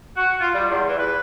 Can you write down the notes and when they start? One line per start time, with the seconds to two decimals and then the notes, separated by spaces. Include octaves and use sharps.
0.16 F#4
0.40 F4
0.54 G3
0.69 E2
0.86 E3
0.98 B4